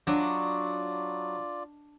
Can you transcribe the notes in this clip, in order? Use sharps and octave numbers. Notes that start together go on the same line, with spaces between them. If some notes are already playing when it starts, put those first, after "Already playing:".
F#3 D4 F4 D5 D#5